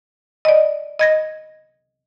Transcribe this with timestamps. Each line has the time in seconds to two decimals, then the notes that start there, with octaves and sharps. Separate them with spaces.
0.45 D5 D#5
0.99 D#5 G#6 A#6